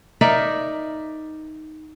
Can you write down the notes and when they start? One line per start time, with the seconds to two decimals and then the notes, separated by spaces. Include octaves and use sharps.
0.21 D#4 A#4 D5 E5